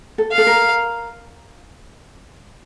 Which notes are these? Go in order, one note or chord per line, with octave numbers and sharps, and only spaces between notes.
A4
F5
A4
A#4